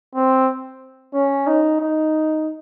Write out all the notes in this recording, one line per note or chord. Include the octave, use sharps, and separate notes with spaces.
C4
C#4
D#4
D#4